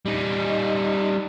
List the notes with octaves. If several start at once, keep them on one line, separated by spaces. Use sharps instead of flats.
G3 D#4